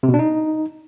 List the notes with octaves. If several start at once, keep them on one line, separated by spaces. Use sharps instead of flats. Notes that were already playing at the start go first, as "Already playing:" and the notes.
C3
B2
D4
D#4